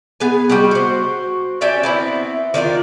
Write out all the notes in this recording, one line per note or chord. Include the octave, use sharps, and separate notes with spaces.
B3 G#4 G#5
G3 G#3 F#4 G4
F#4 C5
C#4 G4 D5 E5
B3 C4 E4
D#3 D4 E4 F4